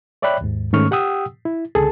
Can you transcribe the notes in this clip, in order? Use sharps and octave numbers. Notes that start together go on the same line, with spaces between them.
C#5 D5 E5 G5 B5 F#6
D#2 G#2
G#2 D#3 A3 C#4 C#6 F6
G4 F#5 G5 D#6 E6
E4
C#2 D3 G#4 A4 A5